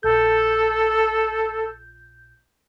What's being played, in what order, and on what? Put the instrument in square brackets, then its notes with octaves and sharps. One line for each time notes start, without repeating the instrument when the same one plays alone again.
[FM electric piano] A#1 G6 [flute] A4